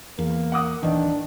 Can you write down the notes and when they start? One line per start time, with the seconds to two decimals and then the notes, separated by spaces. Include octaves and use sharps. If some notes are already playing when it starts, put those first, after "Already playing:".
0.19 E2 A#3
0.52 F#5 D6 D#6
0.83 D1 D#3 E3 D4